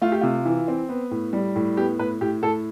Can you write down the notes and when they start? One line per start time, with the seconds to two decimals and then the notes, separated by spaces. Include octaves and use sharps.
0.02 A3 F4
0.12 G4
0.21 C3 F4
0.45 E3
0.68 C4
0.89 B3
1.11 A2
1.33 G3
1.56 A2
1.77 B3 G4
1.99 A2 B4
2.21 A2 G4
2.42 A2 A4